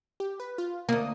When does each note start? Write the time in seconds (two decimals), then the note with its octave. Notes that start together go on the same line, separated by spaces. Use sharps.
0.20 G4
0.40 B4
0.58 F4
0.89 D2 A#3 D#6